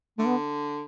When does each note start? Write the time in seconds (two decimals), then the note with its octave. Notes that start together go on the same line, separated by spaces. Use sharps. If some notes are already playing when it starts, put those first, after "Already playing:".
0.18 D3 A3
0.27 B3